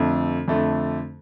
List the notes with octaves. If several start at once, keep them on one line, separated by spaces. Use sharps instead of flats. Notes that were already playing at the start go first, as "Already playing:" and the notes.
Already playing: F2 D3 A3
F2 D3 A3